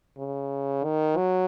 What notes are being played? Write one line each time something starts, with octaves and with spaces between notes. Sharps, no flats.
C#3
D#3
F#3